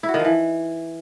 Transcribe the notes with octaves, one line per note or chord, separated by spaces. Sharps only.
E4
F#4
D#3
F3
E3